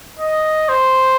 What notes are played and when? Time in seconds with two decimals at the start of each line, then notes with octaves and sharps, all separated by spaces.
0.19 D#5
0.69 C5